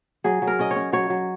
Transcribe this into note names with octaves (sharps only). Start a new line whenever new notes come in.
F#3 G#4
F#3
A#4
C#4 D#5
C#5
C#4
F#3 C#5
F#3